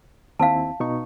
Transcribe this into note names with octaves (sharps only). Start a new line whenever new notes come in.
D#2 C4 E4 F5 A5
B2 D#4 C#6